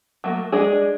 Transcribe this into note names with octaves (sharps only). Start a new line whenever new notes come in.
F#3 A3 A#3
G#3 D4 G#4